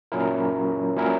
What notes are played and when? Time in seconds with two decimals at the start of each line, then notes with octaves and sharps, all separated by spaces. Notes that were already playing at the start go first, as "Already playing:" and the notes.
0.12 A#2 F#3 C#4 E4 A#4
0.96 A#2 F#3 C#4 E4 A#4